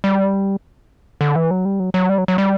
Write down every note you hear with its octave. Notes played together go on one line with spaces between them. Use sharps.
G3
D3
E3
F#3
G3
F#3
F#3
G3
F#3
F#3
G3